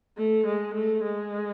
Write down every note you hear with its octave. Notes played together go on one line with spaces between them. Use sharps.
A3
G#3
A3
G#3